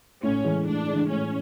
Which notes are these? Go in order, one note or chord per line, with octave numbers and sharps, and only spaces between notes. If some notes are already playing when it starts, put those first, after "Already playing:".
A2 C#4
E3 G#3
A2 D4
E3 G#3
A2 C#4